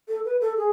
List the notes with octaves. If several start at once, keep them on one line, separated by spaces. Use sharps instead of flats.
A4
B4
A4
G#4